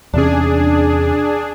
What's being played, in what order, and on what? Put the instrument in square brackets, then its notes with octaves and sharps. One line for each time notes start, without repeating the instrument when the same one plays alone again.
[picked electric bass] E2 C3 C#4 [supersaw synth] D4 G#4